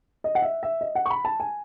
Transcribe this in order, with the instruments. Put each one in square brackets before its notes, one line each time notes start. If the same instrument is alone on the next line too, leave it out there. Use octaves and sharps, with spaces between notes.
[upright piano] D#5
F#5
E5
E5
D#5
F#5
C#6
B5
A5
G#5